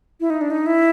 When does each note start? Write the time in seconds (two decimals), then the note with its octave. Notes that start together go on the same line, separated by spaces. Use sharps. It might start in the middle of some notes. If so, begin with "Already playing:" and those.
0.20 E4
0.30 D#4
0.41 D4
0.51 D#4
0.66 E4